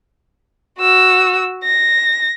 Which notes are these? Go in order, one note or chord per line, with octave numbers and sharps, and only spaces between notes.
F#4 E6
A#6